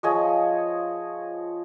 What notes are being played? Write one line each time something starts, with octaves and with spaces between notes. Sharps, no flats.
F3 G#4 C#5 D#5